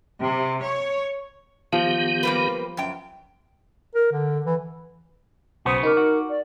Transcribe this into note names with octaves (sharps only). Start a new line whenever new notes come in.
C3
C#5
D#3 F3 B3 G4
G3 A#3 B4
F#2 G5
A#4
D3
E3
B1 C#3 B3 F#4 C5 D#6
D#4 A#4 D6
F#4
D5